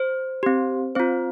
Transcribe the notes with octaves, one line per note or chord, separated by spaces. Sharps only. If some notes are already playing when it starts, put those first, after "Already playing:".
Already playing: C5
C4 G4
C4 F4 C5